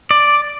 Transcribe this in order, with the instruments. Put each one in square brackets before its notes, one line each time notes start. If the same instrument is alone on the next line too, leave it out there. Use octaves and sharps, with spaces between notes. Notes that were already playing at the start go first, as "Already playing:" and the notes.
[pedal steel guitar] D5